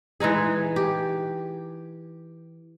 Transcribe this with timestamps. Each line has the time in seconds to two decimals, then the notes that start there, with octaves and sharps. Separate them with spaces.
0.20 E3 G#3 D#4 G#4
0.76 G4